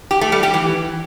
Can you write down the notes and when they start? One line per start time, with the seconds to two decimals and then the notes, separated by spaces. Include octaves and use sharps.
0.11 G4
0.21 A3
0.32 G3
0.43 G4
0.54 E3